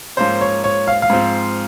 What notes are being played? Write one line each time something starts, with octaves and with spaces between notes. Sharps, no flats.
G#2 F3 A#3 C#4 C5
C#5
C#5
F5
F5
G#2 F3 C4